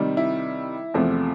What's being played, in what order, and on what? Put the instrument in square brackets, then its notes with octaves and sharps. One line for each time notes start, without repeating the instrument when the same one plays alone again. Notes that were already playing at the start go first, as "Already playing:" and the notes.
Already playing: [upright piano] C3 D#3 G3
E4
E2 C3 F3 A3